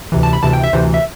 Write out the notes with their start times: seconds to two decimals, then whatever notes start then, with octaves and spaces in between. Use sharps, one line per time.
0.12 D2 C3 E3
0.23 A5
0.33 B5
0.43 D2 C3 E3 A5
0.53 G5
0.64 E5
0.73 D2 C3 E3 C5
0.94 E5